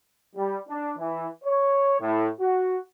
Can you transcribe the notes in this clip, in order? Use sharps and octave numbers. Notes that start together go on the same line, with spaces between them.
G3
D4
E3
C#5
A2
F#4